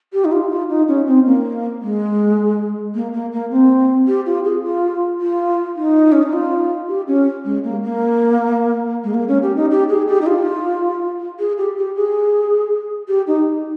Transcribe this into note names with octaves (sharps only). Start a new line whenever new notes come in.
G4
D#4
F4
F4
D#4
C#4
C4
A#3
G#3
A#3
A#3
A#3
C4
G4
F4
G#4
F4
F4
D#4
C#4
D#4
F4
G4
C#4
G#3
A#3
A#3
G#3
A#3
C#4
G4
D#4
G4
G#4
G4
D#4
F4
G#4
G4
G4
G#4
G4
D#4